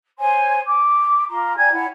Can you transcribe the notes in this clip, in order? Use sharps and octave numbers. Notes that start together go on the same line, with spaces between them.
C5 C#5 G#5 C6
D6
F4 A#5 C6
D5 G5 G#5 G#6
E4 C#5 F#5